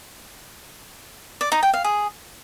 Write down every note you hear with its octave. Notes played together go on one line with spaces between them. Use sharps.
D5
D#4
G5
F5
G#4